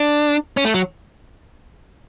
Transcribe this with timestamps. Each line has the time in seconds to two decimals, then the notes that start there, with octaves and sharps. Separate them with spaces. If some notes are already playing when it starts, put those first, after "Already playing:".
Already playing: D4
0.57 C#4
0.65 A3
0.74 F#3